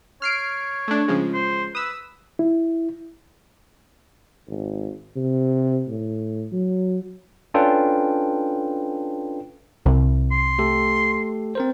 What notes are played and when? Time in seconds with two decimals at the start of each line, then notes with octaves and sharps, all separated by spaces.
0.22 C#5 F6 C7 D7
0.88 A3 D4
1.08 C#3 F3 G#3
1.34 C5
1.75 B4 D#6 E6
2.39 E4
4.48 G#1
5.16 C3
5.88 A2
6.52 F#3
7.54 C#4 D4 F4 A4 B4 G5
9.86 C2
10.31 C6
10.59 A3 G4 A4
11.55 C4 A#4 C5